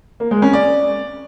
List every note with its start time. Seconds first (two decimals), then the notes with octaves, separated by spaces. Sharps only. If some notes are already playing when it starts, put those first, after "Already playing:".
0.20 A#3
0.31 G#3
0.42 C#4
0.53 D5